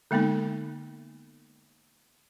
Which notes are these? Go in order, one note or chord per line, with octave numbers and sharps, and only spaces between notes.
D3 G#3 A#3 B3 D#4